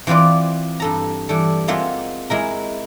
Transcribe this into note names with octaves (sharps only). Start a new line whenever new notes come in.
E3 C4 F4 B4 D5
G2 A4 A#5
E3 G3 A4
G#3 A#3 C4 F4 E5 F#5
G#3 E4 A#4